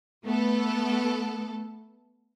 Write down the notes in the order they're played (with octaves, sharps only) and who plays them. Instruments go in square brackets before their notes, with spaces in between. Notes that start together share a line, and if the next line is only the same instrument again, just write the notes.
[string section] A3 B3 A4